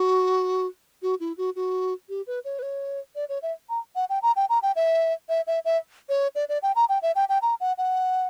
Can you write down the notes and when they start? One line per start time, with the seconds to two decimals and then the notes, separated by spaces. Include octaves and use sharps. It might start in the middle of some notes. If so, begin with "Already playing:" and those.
Already playing: F#4
1.02 F#4
1.20 E4
1.38 F#4
1.56 F#4
2.09 G4
2.27 B4
2.45 C#5
2.59 B4
2.62 C#5
3.15 D5
3.29 C#5
3.42 E5
3.70 A#5
3.96 F#5
4.10 G5
4.23 A#5
4.36 G5
4.50 A#5
4.63 G5
4.76 E5
5.29 E5
5.47 E5
5.65 E5
6.09 C#5
6.35 D5
6.49 D5
6.63 G5
6.76 A#5
6.89 G5
7.02 E5
7.16 G5
7.29 G5
7.42 A#5
7.60 F#5
7.78 F#5